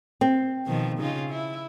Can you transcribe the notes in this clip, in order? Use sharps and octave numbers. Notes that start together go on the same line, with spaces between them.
C4
B2 D#3 F3
C#3 D#4 F4
E4